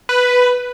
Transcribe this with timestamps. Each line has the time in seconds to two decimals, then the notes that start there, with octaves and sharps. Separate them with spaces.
0.09 B4